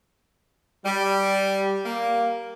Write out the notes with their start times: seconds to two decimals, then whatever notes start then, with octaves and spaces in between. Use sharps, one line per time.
0.85 G3
1.85 A#3